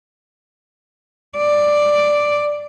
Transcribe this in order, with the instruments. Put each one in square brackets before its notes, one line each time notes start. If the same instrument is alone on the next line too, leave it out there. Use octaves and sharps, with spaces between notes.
[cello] D5